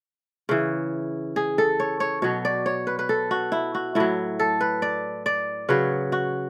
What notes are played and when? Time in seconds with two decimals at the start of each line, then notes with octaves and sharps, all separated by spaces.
0.49 C#3 E3
1.36 G#4
1.58 A4
1.80 C#5
2.00 C#5
2.22 B2 F#3 C#5
2.45 D5
2.66 C#5
2.87 B4
2.99 B4
3.09 A4
3.31 F#4
3.52 E4
3.75 F#4
3.95 A2 F#3 E4
4.39 A4
4.61 B4
4.82 D5
5.26 D5
5.69 C#3 F#3 B4
6.12 F#4